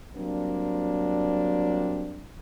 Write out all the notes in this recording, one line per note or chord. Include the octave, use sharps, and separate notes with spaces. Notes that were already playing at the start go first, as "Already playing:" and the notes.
F#3 G3 A#3 C4 D4